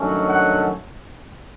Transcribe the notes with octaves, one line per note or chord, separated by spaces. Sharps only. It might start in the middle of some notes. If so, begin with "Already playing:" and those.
Already playing: G2 D#3 F#3 A3 C#4
F#5